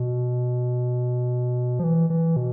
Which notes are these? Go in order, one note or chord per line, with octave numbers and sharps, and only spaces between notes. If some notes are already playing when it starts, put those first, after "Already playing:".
Already playing: B2
F3
E3
E3
B2